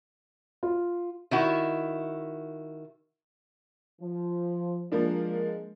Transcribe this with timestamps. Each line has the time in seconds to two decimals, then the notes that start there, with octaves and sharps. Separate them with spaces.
0.63 F4
1.31 D#3 E4 F#4
4.01 F3
4.92 F3 G#3 A#3 D4